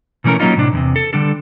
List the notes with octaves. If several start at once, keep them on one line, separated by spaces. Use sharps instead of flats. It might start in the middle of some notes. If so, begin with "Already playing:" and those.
B2 E3 A3 C#4 A#4
F#3 A#3 C#4 D#4 F4
A2 C3 D4
E2 A2 C3
A4
D3 G3 D4 A4